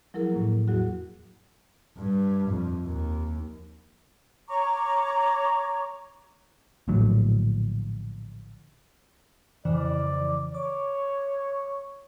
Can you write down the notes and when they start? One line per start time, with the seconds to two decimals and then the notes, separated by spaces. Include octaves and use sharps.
0.14 F3 F#3 E4 G#4 A#4
0.32 A2 A#3
0.67 E2 F#3 F#4 G#4
1.98 G2
2.49 F2
2.85 D#2
4.48 C#5 A#5 C#6 D6
6.88 A#1 A2 D3 F#3
9.65 F2 C#3 E3 D5
10.54 C#5 D6